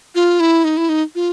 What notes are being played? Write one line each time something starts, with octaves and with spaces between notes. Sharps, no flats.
F4
E4
D#4
E4
D#4
F4